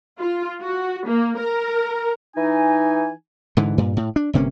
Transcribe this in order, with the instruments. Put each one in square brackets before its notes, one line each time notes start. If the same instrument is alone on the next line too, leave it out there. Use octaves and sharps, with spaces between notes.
[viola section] F4
F#4
A#3
A#4
[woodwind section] E3 D#4 G#5
[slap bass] G#2 D3 E3
G2 A#2
A2
D4
G1 C3 A#3 C#4